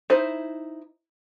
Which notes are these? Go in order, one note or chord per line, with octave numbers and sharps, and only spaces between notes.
D#4 E4 C5